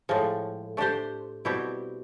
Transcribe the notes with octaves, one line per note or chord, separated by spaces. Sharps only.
A2 F3 G#3
A3 D4 G4 C5
B2 G3 C4 E4 G4